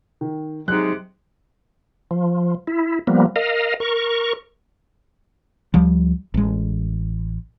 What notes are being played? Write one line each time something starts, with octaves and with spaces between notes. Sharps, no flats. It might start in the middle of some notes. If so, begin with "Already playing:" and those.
D#3
G#2 C3 F#3 G#3 D#4 F#6
F3
E4
F3 G3 A#3 B3
A#4 D#5 F5
A#4 C#6
D2 F3 G3
A1 G#3